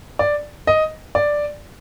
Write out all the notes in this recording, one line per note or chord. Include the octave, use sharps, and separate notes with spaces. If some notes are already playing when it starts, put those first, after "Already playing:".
D5
D#5
D5